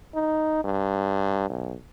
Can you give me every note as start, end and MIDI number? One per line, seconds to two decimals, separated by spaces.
0.14 0.62 63
0.64 1.49 43
1.49 1.75 35